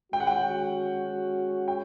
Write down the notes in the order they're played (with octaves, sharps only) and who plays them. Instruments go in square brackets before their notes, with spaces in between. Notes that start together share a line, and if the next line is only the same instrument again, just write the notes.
[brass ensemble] G#3 C#4 F#4 [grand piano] G5
[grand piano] F#5
G5
G5